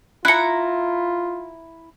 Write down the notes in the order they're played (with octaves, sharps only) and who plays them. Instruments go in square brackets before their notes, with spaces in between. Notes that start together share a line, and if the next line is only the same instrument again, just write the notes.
[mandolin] E4 A#5 [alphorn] F4 [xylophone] F#6 C#7